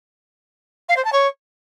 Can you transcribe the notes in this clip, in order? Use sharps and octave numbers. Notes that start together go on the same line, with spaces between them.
F5
C5
A5
C#5